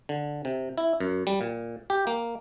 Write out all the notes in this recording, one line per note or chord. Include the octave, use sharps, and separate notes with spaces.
D3
C3
E4
F#2
G3
A#2
G4
A#3